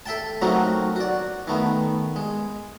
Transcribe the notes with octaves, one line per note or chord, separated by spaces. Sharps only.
A4 E5 G5 A5
F#3 A3 A#3 C4 D#4 F#4
F#4 D5
D#3 A3 B3
G#3